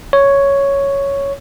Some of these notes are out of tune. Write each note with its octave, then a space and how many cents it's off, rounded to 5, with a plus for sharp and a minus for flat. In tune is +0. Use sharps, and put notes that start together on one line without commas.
C#5 +5